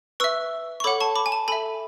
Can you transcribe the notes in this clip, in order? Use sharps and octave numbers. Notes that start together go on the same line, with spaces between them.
B4 E5 C#6 E6
C#6
A4 C#5 F#5 B5 D6
A5 C#6
B5 D6
G#5
A5
A4 E5 G#5 B5